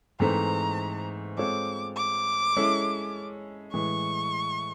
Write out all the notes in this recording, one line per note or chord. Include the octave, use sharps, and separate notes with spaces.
G#2 E3 A3 C4 A#5
G#3 C4 F4 A4 C#5 D6
D6
G#3 C#4 E4 A4
A2 E3 G#3 C#6